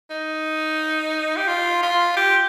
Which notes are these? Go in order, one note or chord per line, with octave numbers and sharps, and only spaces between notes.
D#4
G4
F4
F4
G4